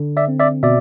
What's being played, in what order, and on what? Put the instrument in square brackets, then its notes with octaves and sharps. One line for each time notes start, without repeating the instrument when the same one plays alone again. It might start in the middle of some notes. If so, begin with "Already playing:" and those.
Already playing: [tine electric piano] D3
D5 E5
C4
D5 E5
B2 D5 E5